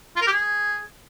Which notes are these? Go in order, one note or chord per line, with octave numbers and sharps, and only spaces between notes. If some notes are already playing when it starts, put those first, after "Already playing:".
F4
A#4
G4
G#4